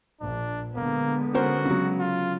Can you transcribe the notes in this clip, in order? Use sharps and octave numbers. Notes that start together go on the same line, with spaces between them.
A#1 D4
D3 G#3 A#3 B3
C#4 F#4 A#4 C5
C#3 F#3
F4